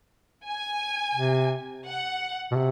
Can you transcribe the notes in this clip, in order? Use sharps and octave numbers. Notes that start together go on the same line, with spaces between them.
G#5
C3
F#5
B2
C3